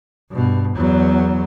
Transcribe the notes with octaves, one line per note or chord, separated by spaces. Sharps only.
G2 B2
E2 F#3